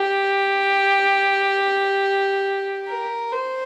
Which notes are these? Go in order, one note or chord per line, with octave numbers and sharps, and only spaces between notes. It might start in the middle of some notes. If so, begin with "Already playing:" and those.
Already playing: G4
A#4
C5